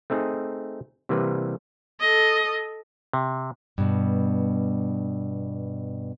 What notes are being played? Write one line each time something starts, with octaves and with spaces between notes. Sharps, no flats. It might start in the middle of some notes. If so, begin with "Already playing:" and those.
A3 C4 D#4 G#4
C3 E3 G3 A#3 B4
A4 D#5
C3
G2 B2